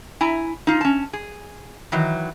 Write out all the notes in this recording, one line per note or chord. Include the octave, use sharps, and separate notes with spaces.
E4 G#5 A#5
D#4 F4
C#4 A5
G#4
D#3 E3 F#3